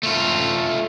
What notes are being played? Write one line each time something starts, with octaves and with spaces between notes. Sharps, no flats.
A3 F4